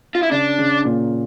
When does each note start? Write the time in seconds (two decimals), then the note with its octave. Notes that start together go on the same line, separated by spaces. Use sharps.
0.15 F4
0.23 E4
0.31 C#3 D4
0.58 C#3
0.85 A#2